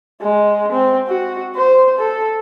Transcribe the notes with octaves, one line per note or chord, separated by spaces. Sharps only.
G#3
C4
F#4
C5
A4